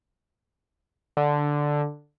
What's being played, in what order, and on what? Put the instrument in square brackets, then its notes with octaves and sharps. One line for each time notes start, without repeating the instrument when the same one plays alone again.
[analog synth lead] D3